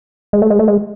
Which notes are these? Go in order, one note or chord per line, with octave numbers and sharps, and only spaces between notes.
G#3
A3
G#3
A3
G#3